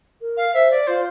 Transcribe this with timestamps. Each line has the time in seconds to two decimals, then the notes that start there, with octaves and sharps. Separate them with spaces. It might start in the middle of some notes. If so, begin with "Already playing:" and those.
0.21 A#4
0.37 F5
0.54 C5 E5
0.71 D5
0.87 F4 C5